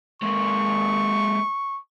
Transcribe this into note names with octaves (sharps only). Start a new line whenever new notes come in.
G#3 A#3 C#6